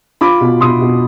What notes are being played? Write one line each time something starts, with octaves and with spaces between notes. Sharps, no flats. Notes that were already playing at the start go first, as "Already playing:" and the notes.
F4 B5 D6
B2
B2 C6 D#6
B2